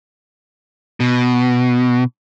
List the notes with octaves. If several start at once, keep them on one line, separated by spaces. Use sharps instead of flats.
B2